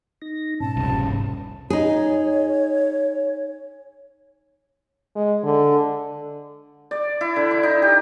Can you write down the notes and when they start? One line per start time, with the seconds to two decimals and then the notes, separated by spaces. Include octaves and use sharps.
0.22 D#4 A#6
0.60 G#2 B2 C#4 A5
0.76 F1 C2
1.70 D#4 G#4 C#5
5.15 G#3
5.43 D3
6.91 D5
7.21 E4
7.36 D3
7.51 D6
7.63 D#4
7.82 G4